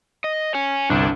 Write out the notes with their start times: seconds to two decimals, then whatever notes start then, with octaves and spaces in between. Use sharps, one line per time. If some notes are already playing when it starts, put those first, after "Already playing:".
0.24 D#5
0.54 C#5 G#5
0.90 G1 C2 D4